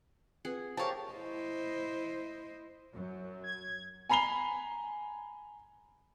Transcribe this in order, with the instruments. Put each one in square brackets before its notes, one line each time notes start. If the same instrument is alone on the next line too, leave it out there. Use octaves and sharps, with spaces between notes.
[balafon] C4 F4 B4 [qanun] G#4 F#5
[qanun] G4 G#4 A#4 [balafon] C5 F5 A#5 [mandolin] C#5 A5
[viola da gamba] E4 C5 D#5
[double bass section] F#2 F#3
[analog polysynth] G#6
[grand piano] G#5 A#5 B5 C7 F7 G7